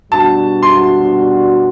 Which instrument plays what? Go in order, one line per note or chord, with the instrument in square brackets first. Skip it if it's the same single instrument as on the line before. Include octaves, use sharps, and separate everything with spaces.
[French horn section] B2 G3 D4 F#4 [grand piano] A5
[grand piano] C6